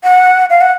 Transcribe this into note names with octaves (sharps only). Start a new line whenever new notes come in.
F#5
F5
F#5